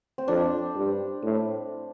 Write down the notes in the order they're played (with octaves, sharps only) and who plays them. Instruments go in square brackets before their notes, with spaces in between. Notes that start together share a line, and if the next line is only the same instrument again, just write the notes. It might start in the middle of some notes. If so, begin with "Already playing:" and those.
[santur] C4
[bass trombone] F2 [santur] D4
[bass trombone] G2
A2